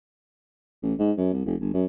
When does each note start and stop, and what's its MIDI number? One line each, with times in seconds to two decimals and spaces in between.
0.82 0.94 33
0.99 1.12 44
1.17 1.31 42
1.33 1.42 36
1.46 1.55 29
1.60 1.73 31
1.74 1.85 42